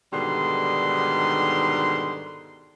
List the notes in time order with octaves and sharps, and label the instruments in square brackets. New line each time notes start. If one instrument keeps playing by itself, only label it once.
[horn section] G#2 B2 D3 D#3 G3 C6